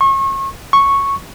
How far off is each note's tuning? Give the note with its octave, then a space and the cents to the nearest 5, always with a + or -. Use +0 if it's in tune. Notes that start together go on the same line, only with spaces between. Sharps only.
C#6 -35
C#6 -5